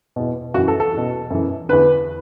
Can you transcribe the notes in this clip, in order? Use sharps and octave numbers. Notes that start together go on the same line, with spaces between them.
E2 B2
F#2 E3 F#4
A4
A4
E2 B2
F#2 E3
E2 D3 B4